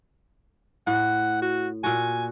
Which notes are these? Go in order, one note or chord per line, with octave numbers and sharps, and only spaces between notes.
A2 F#5
F#4
A#2 F#4 G#5